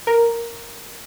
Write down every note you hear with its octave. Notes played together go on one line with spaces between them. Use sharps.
A#4